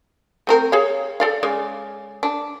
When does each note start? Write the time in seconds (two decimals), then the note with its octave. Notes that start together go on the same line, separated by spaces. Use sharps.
0.47 A3 C4 A#4
0.72 G#4 C#5 F5
1.20 A4 D5 F5
1.43 C#3 G#3 D5
2.23 D4